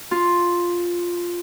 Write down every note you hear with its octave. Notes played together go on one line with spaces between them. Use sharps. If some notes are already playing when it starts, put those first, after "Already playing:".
F4